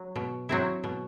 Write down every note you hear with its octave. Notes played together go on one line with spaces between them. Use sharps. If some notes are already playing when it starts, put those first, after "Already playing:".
Already playing: F#3
B2
F#3 C4 E4
B2